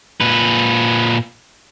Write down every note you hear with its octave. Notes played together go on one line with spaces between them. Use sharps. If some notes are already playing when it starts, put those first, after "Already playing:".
A#2 B4